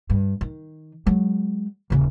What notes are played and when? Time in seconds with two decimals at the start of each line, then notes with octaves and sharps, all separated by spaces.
0.10 G2
0.41 D#3
1.07 F#3 G#3
1.90 D#1 C#3